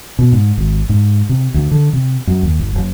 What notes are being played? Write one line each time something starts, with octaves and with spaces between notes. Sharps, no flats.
B2
G#2
G#1
G#2
C3
D2
D3
C3
F#2
D#2
G1
F#1